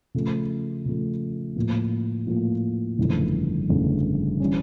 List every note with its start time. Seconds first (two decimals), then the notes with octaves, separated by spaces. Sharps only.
0.14 C#3 F3 A3
0.85 C#3 F3 A3
1.56 A2 F3 A#3
2.27 A2 F3 A#3
2.98 G1 F2 C#3 E3 A3
3.69 G1 F2 C#3 E3 A3
4.40 E3 G3 C#4